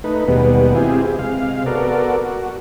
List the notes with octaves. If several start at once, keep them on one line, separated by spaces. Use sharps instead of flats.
A3 D#4 B4
D#2 B2 G3 G#3 B3
G#3 C4 E4 F4 G4 G#4
C3 G#3 F5
B3 F#4 A4 A#4 D5
F#4